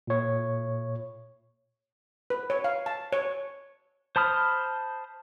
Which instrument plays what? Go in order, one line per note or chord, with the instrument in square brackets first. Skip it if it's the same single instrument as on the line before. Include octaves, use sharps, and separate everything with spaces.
[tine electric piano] A#2 C#5
[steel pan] B4
C#5
F5
A5
C#5
[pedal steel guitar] C5 A5 B5 D#6 F6